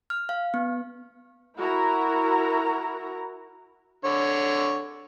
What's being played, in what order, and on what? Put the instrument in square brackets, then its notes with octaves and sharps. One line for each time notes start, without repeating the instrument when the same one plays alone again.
[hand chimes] F6
F5
B3
[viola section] E4 F#4 A#4 A#5
[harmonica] D3 C#5